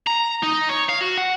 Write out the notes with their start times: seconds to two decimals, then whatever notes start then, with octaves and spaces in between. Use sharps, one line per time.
0.07 A#5
0.43 D#4
0.69 C#5
0.89 F5
1.01 F#4
1.18 F#5